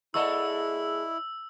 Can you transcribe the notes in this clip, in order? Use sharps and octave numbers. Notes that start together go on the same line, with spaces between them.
G#3 A#3 E4 A4 D5 D#5 C#6 E6